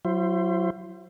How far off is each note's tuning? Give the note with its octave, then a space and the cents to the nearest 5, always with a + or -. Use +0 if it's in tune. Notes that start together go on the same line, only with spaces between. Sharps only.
F#3 +0 E4 +40 C5 +5